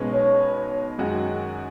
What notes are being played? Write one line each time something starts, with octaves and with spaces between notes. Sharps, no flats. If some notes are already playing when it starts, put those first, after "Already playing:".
Already playing: B1 B2 G#3 C#4 B4
C#5
F#2 D#3 G#3 C#4 F#4